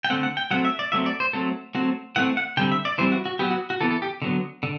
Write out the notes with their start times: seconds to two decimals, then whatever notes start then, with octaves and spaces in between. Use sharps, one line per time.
0.05 G5
0.10 D3 A3 C4 F#5
0.23 F#5
0.37 G5
0.51 F#3 A3 C4 F#5
0.65 E5
0.79 D5
0.92 F#3 A3 C4 E5
1.06 D5
1.20 C5
1.33 F#3 A3 C4 A4
1.75 F#3 A3 C4 F#4
2.16 E3 A3 C4 F#5
2.37 F#5
2.57 D3 G3 C4 G5
2.72 E5
2.85 D5
2.98 E3 G3 C4 C5
3.12 F#4
3.25 F#4
3.39 F#3 B3 G4
3.50 F#4
3.70 F#4
3.81 E3 B3 A4
3.91 A4
4.02 G4
4.22 D3 F#3 B3
4.63 D3